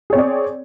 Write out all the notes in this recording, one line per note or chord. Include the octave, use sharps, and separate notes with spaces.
C4 G#4 C#5 D5